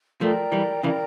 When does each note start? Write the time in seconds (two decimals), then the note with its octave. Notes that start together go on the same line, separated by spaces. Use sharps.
0.21 F3 A3 A#4 D5 G5 A#5
0.52 E3 G3
0.83 C#3 E3 A#4 D5 G5 A#5